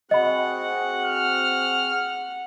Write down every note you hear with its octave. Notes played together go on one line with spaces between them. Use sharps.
C4 F#4 G#4 D#5 F#5 B5
F6